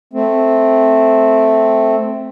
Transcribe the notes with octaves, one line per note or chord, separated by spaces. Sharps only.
A3 C4